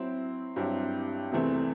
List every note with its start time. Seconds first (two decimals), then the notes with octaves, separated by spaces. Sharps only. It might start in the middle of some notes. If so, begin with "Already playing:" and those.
Already playing: F#3 C4 E4
0.56 G2 F#3 C4 E4 G4
1.31 E2 C3 E3 A3 C4